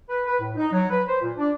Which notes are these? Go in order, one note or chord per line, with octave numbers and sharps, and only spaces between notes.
B4
B4
A2
D#4
F#3
B4
C5
A#2
D4